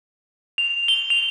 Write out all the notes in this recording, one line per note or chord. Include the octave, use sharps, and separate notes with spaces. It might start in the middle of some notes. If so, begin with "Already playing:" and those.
F7
G7
F7